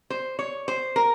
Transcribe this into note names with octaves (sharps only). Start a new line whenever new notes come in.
C5
C#5
C5
A#4